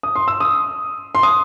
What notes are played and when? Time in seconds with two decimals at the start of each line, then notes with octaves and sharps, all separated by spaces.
0.03 D#6
0.16 C6
0.28 E6
0.40 D#6
1.15 C6
1.23 D#6